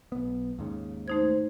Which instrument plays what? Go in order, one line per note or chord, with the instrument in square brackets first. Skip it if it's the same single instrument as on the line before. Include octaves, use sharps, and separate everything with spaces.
[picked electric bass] B1 B3
D#2 G#2 C#3
[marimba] A3 D#4 G#6 [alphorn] C5